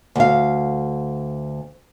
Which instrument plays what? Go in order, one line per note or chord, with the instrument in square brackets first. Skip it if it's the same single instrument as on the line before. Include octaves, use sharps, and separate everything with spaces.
[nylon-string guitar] D2 F5